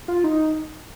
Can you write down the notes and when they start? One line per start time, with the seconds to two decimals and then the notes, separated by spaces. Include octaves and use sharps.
0.08 F4
0.24 D#4